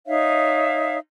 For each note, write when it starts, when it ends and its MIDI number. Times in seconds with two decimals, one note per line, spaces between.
0.07 0.98 63
0.07 0.98 73
0.07 0.98 76
0.07 0.98 77